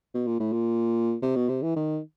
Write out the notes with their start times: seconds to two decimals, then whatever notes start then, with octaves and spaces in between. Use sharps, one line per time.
0.15 B2
0.27 A#2
0.40 A2
0.52 A#2
1.22 C3
1.36 B2
1.49 C3
1.63 E3
1.76 D#3